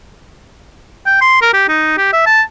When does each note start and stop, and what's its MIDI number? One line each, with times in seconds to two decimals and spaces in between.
1.06 1.17 79
1.21 1.38 84
1.42 1.52 70
1.53 1.66 67
1.68 1.93 63
1.98 2.10 67
2.13 2.24 76
2.26 2.42 81